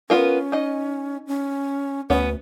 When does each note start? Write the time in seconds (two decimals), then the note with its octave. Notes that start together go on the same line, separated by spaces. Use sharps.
0.10 B3 C#4 F4 A#4
0.52 D#4 D#5
1.27 C#4
2.10 D2 B3 C#4 B4